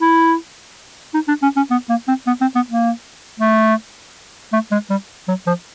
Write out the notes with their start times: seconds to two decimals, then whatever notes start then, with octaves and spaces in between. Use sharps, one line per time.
0.01 E4
1.14 D#4
1.28 D4
1.43 C#4
1.56 C#4
1.71 B3
1.89 A#3
2.08 C4
2.27 B3
2.41 C4
2.55 B3
2.69 A#3
3.40 A3
4.53 A3
4.71 G#3
4.90 G3
5.28 F#3
5.47 F3